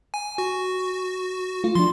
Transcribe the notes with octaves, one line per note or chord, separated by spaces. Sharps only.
G#5
F#4
A3 F4
F3 D4 C6